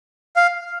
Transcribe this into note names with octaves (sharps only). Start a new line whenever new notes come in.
F5